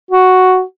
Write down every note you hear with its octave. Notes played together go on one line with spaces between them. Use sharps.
F#4